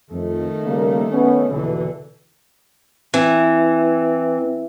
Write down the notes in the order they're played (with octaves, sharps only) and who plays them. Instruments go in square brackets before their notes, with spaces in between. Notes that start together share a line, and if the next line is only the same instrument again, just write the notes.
[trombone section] F2 [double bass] D#3 A3
[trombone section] C#3 G3 A#3
B3 C#4
[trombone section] A#1 E2 B2 [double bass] D3 E3
[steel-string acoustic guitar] E3 [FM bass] C4